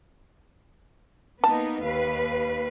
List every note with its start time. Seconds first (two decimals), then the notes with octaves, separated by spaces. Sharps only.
1.44 A#3 B3 D#4 A5
1.83 D#2 B4 F5